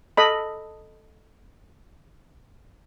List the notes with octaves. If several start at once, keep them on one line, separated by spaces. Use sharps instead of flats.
A4 D#5 B5